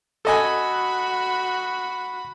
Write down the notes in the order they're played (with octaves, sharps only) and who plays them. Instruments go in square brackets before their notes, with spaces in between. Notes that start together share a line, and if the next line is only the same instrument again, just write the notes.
[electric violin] F#4 B5 [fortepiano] A4 D#5 G#5